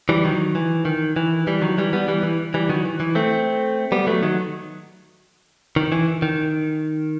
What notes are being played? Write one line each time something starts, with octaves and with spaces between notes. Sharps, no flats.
E3 G3
D#3 F#3
E3
D#3
E3
E3 G3
D#3 F#3
E3 G3
G3 B3
E3 G3
E3
E3 G3
D#3 F#3
E3
E3
A3 C4
G3 B3
F#3 A3
D#3 F#3
D#3
E3
D#3